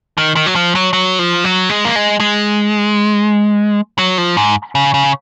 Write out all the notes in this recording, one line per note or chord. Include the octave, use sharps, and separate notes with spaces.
D#3
D#3
F#3
F3
F#3
F#3
F3
F#3
G#3
A#3
G#3
G#3
F#3
F3
G#2
C#3
C#3